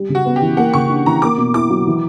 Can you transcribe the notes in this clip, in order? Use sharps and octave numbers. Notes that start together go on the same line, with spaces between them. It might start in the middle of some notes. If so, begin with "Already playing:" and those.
Already playing: G3
C#3
F#4
B3
G4
E3
A#3 F#5
C#3 C#6
D4
E3 A#5
A#3 D6
B2
E4 D6
F#3
E3